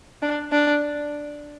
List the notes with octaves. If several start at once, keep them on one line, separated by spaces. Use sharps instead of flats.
D4
D4